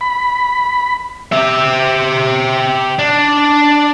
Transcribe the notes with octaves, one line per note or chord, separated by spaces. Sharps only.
B5
G4 E5
D4